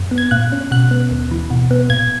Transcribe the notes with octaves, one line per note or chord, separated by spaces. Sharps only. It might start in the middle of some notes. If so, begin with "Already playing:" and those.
Already playing: F#2
B3
G#6
A#2 F#6
C#4
B2 F#6
B3
D#2
E3
B2
B3
A#2 G#6